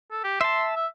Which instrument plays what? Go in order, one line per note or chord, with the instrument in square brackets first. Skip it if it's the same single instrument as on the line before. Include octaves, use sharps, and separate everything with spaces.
[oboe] A4
G4
[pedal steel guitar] E5 A5 [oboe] C6
[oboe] E5